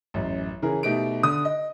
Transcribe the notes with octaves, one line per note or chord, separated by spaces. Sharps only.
A1 F#2
C#3 E3 G#4 A#4
B2 A3 D#4 G4 D7
D3 D#6
D#5